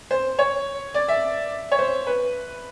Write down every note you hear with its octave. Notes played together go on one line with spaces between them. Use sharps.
C5
C#5
D5
E5
C#5
C5
B4